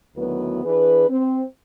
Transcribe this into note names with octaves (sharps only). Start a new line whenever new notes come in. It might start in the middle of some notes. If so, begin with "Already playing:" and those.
D2 D#3 F#3 B3 E4 B4
E3 D4 G#4 B4
C4